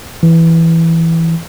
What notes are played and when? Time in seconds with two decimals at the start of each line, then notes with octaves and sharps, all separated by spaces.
0.23 E3